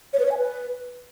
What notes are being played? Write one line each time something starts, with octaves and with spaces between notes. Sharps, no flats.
C#5
B4
C#5
G#5
B4